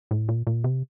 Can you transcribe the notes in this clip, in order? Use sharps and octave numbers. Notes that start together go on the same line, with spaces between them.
A2
A#2
A#2
C3